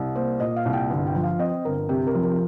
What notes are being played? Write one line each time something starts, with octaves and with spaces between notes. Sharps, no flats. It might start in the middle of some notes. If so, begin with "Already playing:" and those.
Already playing: C2
A#3 C5
A#2 D#5
F5
C2
G5
G1
G5
F3
F5
C4 D#5
G1 A#4
C3 G4
A#4
F3
A#4